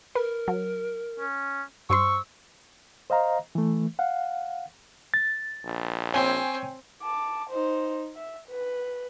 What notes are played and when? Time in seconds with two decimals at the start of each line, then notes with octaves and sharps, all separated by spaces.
0.15 A#4 B4
0.48 F#3
1.20 C#4
1.90 G2 C5 C6 C#6 E6
3.10 C5 D#5 F5 A#5
3.55 E3 A3
3.99 F5 F#5
5.14 A6
5.65 A#1
6.14 C4 C#5 G5 G#5
7.02 A5 D6
7.49 D#4 C5
8.16 E5
8.48 B4